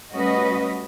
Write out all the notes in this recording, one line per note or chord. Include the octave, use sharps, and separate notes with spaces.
G3 A3 C#4 F#4 B4 D#5